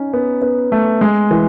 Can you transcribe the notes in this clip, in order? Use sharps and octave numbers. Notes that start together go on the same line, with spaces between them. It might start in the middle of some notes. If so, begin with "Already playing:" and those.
Already playing: C#4 D#4
B3
B3
A3
G#3
E3